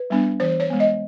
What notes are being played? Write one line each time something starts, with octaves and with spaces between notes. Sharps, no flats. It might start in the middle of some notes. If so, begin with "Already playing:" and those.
Already playing: B4
G3 B3 D4
E3 C5
C#5
G#3 B3
D#5